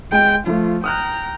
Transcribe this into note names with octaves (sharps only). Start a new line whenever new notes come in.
G#3 G5
F3 A3 F4
G5 A#5 D#6 F6 F#6